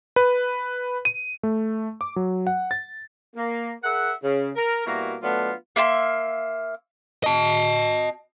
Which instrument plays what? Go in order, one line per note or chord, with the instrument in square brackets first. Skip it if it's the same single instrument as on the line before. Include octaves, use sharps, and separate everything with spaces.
[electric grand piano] B4
D#7
A3
D6
F#3
F#5
A6
[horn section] A#3
G#4 A#4 E5 F#5
C#3
A#4
B2 G3 A#3 E4 F#4 A#4
F#3 A3 B3 D4 F4
[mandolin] A#3 E5 G#5 C6
[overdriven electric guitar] D#5 A5